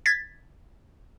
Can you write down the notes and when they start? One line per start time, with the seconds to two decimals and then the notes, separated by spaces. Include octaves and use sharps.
0.06 G#6 A6 B6